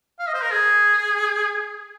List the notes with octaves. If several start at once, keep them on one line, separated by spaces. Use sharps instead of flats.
F5
D#5
C5
A#4
G#4